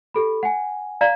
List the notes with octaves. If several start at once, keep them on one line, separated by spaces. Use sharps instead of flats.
G4 A4 B5
F#5 G#5
D5 F5 A#5